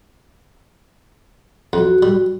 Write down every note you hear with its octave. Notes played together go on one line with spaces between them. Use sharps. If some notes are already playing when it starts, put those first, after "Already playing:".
F2 F#4
G3